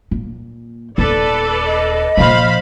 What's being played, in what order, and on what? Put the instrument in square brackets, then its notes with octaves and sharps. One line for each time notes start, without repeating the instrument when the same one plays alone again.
[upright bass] A#2
[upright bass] D#1 B3 [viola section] A4 B4 D5
[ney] D#5
[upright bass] A#2 F3 [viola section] C5 F5 B5